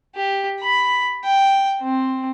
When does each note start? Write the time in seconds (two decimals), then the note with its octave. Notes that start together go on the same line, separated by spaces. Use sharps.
0.16 G4
0.61 B5
1.25 G5
1.81 C4